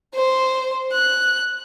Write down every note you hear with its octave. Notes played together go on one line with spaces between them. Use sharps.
C5
F#6